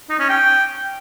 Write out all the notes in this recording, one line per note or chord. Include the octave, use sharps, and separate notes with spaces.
D#4
C#4
G5